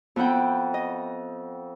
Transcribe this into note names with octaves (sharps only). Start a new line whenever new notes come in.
F2 B3 E4 F#5 G5
D#5